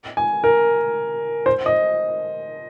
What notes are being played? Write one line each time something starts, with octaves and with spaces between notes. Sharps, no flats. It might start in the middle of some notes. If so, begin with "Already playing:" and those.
G#5
A#4
C5
D#5